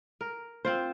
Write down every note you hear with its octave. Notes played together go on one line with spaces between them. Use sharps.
A#4
C4 F4 C5